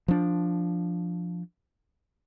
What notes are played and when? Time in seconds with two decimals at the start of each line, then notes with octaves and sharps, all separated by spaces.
0.08 F3 D4